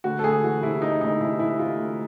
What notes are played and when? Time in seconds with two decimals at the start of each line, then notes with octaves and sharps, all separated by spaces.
0.04 D2 F#4
0.19 A4
0.24 D2 G#4
0.44 E3 F#4
0.62 C3 E4
0.82 E3 D#4
1.01 D2 D#4
1.20 C3 E4
1.39 C3 E4
1.59 C3 F4
1.78 D2